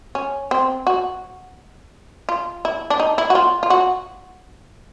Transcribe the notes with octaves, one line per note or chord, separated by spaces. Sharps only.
C#4
C4
F#4
F4
E4
D4
D#4
E4
F#4
F4
F4
F#4